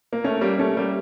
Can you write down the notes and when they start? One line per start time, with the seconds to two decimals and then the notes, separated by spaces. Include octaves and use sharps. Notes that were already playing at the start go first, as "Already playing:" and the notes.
0.13 A#3
0.24 A3 C#4
0.41 G3 A#3
0.59 A3 C#4
0.77 G3 A#3